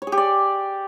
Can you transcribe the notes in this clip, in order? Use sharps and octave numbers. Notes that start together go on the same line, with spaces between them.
C#5
G#4
G4
D5